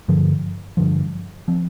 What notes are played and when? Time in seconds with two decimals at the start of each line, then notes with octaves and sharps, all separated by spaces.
0.08 G2 D3 F3
0.77 G2 D3 F3
1.48 F3 C4